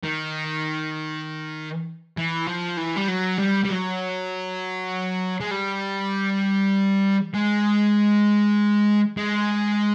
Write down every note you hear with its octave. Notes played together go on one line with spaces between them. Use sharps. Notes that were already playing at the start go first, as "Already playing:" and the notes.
D#3
E3
F3
E3
G3
F#3
G3
G3
F#3
G#3
G3
G#3
G#3